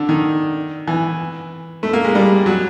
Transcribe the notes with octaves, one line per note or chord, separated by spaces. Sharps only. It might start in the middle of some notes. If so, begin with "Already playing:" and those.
Already playing: D3
D#3
E3
A3
A#3
G#3
G3
F#3